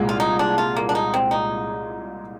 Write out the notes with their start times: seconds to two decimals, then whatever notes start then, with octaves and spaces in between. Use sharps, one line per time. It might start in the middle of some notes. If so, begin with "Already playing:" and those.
Already playing: C2 A#2 G#3
0.09 F4
0.20 D#4
0.39 D4
0.58 F4
0.76 A#3
0.89 D4
0.95 D#4
1.14 C4
1.31 D#4